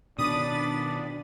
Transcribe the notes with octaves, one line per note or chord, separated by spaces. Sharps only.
B2 D#3 D4 D5 B5 D#6 A6 D#7